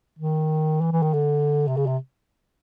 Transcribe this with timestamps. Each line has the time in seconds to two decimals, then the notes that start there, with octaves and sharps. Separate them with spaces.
0.19 D#3
0.82 E3
0.92 E3
1.03 D#3
1.14 D3
1.68 C3
1.77 C#3
1.87 C3